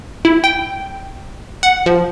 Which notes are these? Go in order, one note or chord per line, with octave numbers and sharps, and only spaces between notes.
E4
G5
F#5
F3